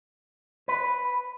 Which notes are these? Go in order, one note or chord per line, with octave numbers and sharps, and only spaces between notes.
B4